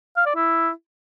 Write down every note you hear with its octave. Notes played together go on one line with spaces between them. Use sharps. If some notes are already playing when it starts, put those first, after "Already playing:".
F5
D5
E4